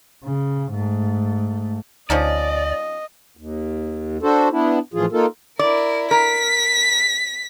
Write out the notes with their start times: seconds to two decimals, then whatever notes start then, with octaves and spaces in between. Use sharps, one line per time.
0.24 C#3
0.73 G#2 A3
2.10 D2 F3 C#4 D#4 D5 D#5
3.37 D#2
4.22 D4 F#4 A4 C5
4.52 B3 D4 E4
4.94 A2 E3 F3 F4 G#4
5.12 A#3 D#4 F4 A4 A#4
5.59 E4 A#4 D5
6.11 A#4 B6